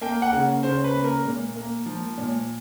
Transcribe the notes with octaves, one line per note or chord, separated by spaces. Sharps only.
A#3 G5
F#5
C#3
C#3 C5
B4
A#3
A#4
A#2
A#3
F3
A#2